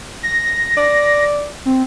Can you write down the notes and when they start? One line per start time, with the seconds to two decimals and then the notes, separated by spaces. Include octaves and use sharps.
0.23 A#6
0.77 D5
1.65 C4